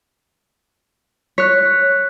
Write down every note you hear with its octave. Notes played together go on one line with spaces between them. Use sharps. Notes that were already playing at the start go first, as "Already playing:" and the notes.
C#5 F#6 B6